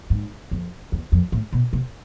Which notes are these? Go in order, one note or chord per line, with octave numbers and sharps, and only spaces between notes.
G#2
F2
E2
F2
A2
B2
C3